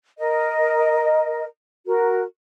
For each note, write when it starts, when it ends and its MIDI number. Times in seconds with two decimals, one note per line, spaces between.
0.19 1.44 70
0.19 1.44 75
1.86 2.22 66
1.86 2.22 70